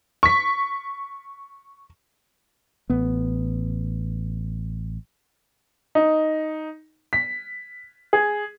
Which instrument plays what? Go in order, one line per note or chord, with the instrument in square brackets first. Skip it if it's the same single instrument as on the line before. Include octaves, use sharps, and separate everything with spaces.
[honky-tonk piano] C#6 B6
[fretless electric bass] A1 B3
[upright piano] D#4
B6
G#4